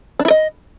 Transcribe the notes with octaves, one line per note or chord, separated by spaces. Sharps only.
D4
E4
D#5